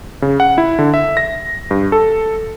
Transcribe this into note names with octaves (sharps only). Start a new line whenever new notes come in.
C#3
F#5
E4
D3
E5
A#6
G2
A4